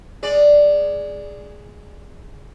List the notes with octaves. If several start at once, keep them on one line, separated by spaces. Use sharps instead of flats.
G#3 D5